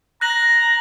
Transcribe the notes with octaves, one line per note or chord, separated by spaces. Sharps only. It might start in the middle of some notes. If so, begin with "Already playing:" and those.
A#5 F#6 A#6 F#7